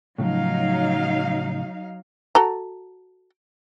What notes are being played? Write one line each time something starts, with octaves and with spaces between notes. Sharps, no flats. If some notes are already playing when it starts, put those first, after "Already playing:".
A2 C#3 F3 F#3 D#4 F5
F#4 A4 A#5